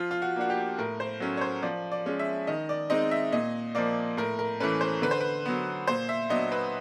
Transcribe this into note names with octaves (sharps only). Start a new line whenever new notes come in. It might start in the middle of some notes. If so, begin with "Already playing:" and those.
Already playing: F3 F4
F4
F#4
A#3 D4 F#4
G4
A2 A#4
C5
F#3 A3 C#4
C#5
C5
F3 D5
D5
G#3 C#4
E5
D#3 D#5
D5
G#3 C4 D#4 D#5
E5
A#2 D#5
F3 A#3 D5
A2 A#4
A#4
E3 A3 C#4 B4
C5
D3 B4
C5
B4
F#3 B3
A#2 C5
E5
F#3 B3 D4 D#5
B4